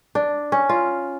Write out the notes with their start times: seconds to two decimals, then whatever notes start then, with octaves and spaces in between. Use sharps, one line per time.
0.15 D4
0.52 C#4
0.69 F4